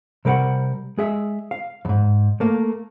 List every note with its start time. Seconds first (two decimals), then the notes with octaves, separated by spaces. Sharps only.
0.25 C3 G3 A#4 F5 F#5
0.98 G#3 G#4 E5
1.51 F5
1.85 F2 G#2
2.40 A3 A#3